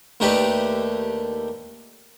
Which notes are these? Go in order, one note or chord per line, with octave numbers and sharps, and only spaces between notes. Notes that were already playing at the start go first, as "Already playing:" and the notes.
D#2 A3 D4 D#4 G4 B4